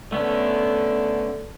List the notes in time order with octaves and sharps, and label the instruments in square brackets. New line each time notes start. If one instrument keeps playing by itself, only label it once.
[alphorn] D3 [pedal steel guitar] A3 B3 C#4